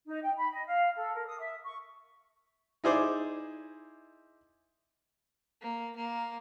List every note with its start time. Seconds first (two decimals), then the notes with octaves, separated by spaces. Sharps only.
0.07 D#4
0.23 G5
0.36 B5
0.53 D#5
0.67 F5
0.96 A4
1.13 A#4
1.27 D#6
1.39 E5
1.63 C#6
2.84 D#4 E4 G#4 C5 D5
5.62 A#3
5.96 A#3